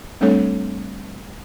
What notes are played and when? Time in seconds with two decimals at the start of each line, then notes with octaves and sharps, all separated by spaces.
0.21 G3 A3 C4 D4 A4 C#5